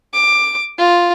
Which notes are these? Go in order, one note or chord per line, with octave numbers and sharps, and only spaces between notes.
D6
F4